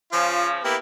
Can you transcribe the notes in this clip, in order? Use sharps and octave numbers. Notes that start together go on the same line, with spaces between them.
C#3 F3 F4
A#3 B3 E4 G4